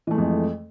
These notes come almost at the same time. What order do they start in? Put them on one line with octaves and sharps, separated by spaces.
E3 A3 G#3 F2